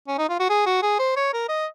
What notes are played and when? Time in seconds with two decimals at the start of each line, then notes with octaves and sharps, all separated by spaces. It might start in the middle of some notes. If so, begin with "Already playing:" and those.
0.08 C#4
0.18 D#4
0.29 F4
0.40 F#4
0.49 G#4
0.66 F#4
0.82 G#4
0.99 C5
1.16 C#5
1.33 A#4
1.49 D#5